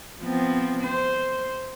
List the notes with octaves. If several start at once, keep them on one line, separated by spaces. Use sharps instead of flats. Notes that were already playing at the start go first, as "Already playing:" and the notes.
F3 B3 C4
C5